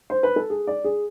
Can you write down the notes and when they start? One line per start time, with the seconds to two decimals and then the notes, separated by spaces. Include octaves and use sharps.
0.10 C5
0.23 B4
0.36 A4
0.50 G#4
0.67 D5
0.84 G#4